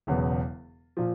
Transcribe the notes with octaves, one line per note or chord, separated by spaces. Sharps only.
E1 E2 C#3 F#3 B3
A#2 F3